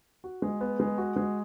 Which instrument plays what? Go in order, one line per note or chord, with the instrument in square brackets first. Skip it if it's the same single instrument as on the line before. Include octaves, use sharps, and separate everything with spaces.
[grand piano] F#4
G#3
B3
G#3
F#4
G#3